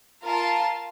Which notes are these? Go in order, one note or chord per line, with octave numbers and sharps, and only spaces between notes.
F4 A#4 F5 A5